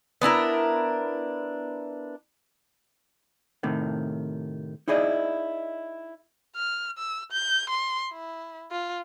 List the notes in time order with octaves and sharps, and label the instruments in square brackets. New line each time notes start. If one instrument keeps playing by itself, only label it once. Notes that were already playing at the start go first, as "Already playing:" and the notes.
[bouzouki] B3 D4 E4 A#4
[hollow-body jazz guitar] A2 C3 D#3
D#4 E4 G#4 D5 D#5
[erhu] F6
E6
G6
C6
E4
F4